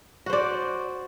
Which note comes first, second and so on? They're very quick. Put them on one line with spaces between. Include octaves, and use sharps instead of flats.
F#4 C5 D5